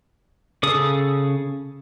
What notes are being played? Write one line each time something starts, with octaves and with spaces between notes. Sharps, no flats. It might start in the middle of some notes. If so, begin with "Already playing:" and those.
C#3 G#4 A4 D#6